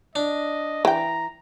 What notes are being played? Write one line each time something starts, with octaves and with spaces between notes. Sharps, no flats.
D4 D#5
E3 G5 A#5